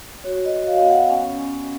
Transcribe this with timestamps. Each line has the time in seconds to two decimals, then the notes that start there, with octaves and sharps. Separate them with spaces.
0.24 F#4 C#5
0.45 D#5
0.52 F#4
0.67 F5
0.81 B3
0.88 F#5
1.10 C#4 G#5
1.39 C#4